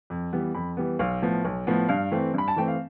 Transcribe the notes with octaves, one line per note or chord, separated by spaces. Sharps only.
F2
E3 G3 B3
F2 B5
E3 G3 B3
B1 F5
A2 F3 B3
B1
A2 F3 B3
G2 F5
E3 A3 C4
G2 B5
A5
E3 A3 C4 G5
F5